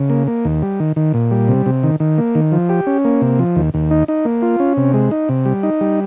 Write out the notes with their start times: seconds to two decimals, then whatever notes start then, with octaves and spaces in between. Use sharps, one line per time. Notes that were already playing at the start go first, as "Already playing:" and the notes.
Already playing: C#3
0.10 A#3
0.27 A#3
0.45 D#2
0.62 G3
0.80 D#3
0.96 D#3
1.14 A#2
1.31 G3
1.48 C3
1.66 C3
1.83 D#3
2.00 D#3
2.18 A#3
2.35 D#3
2.52 F3
2.69 G4
2.87 C#4
3.05 A#3
3.21 C3
3.39 F3
3.56 D#2
3.74 D#2
3.91 D#4
4.08 D#4
4.25 A#3
4.42 F4
4.60 C#4
4.77 C3
4.94 G#3
5.11 D#4
5.29 C3
5.46 G3
5.63 D#4
5.81 G3